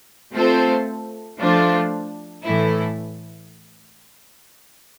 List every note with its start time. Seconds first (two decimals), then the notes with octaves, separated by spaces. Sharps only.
0.33 A3 C4 F4 A4 C5
1.38 F3 A3 D4 F4 C5
2.44 A2 E3 A3 E4